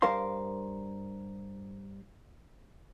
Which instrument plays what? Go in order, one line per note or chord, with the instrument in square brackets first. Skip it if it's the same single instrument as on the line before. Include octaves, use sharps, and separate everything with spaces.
[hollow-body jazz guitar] G2 A#4 C5 F5 C6